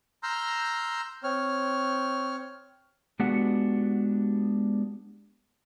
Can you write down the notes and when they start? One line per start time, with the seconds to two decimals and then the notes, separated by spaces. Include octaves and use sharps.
0.23 A#5 C6 E6 F6 G6
1.24 C4 C#5 F6
3.20 G#3 B3 D4 F#4 G4 F#5